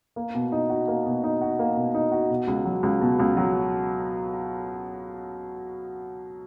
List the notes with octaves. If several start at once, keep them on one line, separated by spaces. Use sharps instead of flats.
A#3
B2
D#4
F#4
A#3
B2
D#4
F#4
A#3
B2
D#4
F#4
B2
C#2
F#3
C#2
B2
C#2
F#3